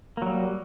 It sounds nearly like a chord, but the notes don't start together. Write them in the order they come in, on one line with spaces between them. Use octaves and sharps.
A#3 F#3 G3